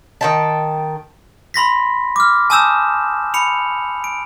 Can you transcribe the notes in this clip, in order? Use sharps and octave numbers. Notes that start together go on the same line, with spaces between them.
D#3 G5 A5
B5 C6 A#6 B6
D6 F6
G#5 A5 D#6 E6 G6 E7
B5 C#7 F7
D7